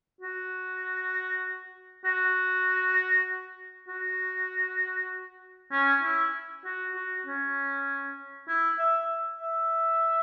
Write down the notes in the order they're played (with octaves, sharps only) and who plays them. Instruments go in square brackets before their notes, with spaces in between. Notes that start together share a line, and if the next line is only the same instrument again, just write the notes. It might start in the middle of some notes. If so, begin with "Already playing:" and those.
[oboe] F#4
F#4
F#4
C#4
E4
F#4
F#4
C#4
E4
E5
E5